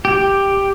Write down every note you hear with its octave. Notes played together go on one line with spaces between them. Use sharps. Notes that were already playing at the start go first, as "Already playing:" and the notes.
G4